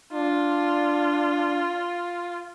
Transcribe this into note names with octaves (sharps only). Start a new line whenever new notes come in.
D4 F4